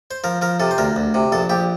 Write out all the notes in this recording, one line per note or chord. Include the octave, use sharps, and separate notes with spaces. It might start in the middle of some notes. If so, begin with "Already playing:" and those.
C5
F3 A#4
F3 A#4
C3 A4
C5
D2 A#4
D2
C3
A#1 A4
A#1 G4